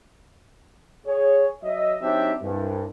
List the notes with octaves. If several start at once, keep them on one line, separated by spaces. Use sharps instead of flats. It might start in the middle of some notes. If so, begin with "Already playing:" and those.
G#4 C#5
F#3 D#5 E5
F#3 C4 D4 D#4 G4 E5
C2 G2